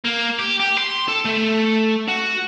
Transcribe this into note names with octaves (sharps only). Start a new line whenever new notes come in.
A#3
G4
G4
C6
A4
A3
F#4